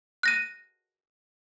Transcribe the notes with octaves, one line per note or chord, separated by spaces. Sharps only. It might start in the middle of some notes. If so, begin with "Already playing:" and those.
F#6 A#6 D#7